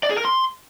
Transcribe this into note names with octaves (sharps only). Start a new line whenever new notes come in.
D5
G#4
A#4
C6